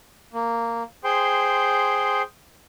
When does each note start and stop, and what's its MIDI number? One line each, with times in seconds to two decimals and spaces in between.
0.33 0.83 58
1.04 2.22 68
1.04 2.22 72
1.04 2.22 79
1.04 2.22 84